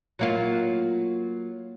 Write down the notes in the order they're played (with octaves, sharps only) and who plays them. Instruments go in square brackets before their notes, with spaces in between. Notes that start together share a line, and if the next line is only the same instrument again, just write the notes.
[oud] F#3 A#3 F4